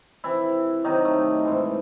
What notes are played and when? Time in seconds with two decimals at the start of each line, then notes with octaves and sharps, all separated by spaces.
0.24 C3 E3 E4
0.84 C3 D#3 F#3 D#4
1.05 A3
1.45 G#2 E3